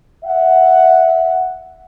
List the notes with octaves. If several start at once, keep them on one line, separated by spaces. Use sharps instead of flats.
E5 F#5